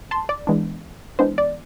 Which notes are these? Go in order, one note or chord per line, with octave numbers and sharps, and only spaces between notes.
A5 C6
D5
E3 G#3 B3 D4
E3 G#3 B3 D4 C5
D5